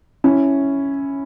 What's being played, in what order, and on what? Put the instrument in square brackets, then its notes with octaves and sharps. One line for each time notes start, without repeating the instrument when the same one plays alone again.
[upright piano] C#4 E4